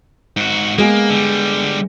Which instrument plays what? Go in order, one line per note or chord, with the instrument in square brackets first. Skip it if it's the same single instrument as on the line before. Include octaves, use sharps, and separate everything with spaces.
[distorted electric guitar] G#2 F#4
[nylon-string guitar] G#3 B3 G#4 [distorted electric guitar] A#3
[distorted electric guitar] D3 G3